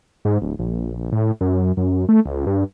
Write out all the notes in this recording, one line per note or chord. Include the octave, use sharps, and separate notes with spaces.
G#2
D1
A#1
A2
F#2
F#2
A3
C#2
G2